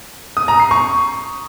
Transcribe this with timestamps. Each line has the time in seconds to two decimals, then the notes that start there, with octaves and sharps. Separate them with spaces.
0.37 D#6
0.48 A#5
0.60 C7
0.71 C#6